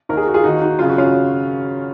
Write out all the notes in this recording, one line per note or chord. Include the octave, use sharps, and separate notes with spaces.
D#2 D#3 A#4
G#4
F#4
F4 G#4
D#2 D#3 D#4 F#4
D#4 F#4
G#1 F#2 C#3 F4
F#4
C#4 F4